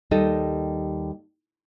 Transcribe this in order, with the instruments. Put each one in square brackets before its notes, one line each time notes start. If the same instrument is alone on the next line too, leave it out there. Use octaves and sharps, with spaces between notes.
[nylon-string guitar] D#2 G3 D#4 A4 D#5